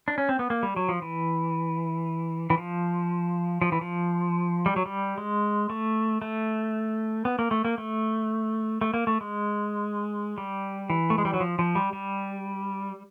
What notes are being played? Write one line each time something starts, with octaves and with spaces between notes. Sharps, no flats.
D4
C#4
C4
B3
A#3
G3
F#3
F3
E3
E3
F3
F3
E3
F3
G3
F#3
G3
G#3
A3
A3
B3
A#3
A3
A#3
A3
A3
A#3
A3
G#3
G3
E3
A3
G#3
G3
F#3
F3
F3
G3
G3